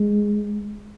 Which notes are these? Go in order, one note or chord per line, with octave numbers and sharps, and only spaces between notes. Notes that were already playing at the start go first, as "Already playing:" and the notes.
Already playing: G#3